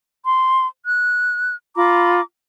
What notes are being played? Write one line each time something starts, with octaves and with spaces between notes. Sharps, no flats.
C6
F#6
F4 A#5 B5 D6